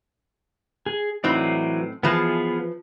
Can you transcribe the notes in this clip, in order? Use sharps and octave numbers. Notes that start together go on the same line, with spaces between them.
G#4
A2 E3 F#3 C4 D#4 D5
E3 F3 B3 F4 G#4 A5